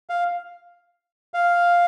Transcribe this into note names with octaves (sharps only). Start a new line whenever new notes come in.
F5
F5